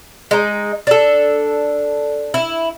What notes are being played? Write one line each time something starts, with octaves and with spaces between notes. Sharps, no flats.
G#3 D#4
D4 A4
E4